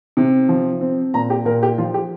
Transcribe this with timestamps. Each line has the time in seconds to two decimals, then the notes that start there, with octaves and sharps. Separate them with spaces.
0.17 C3
0.49 F3
0.81 C4
1.14 A#2 A#5
1.30 G4
1.45 A#2 A#4
1.63 G4
1.78 F3 F4
1.94 G4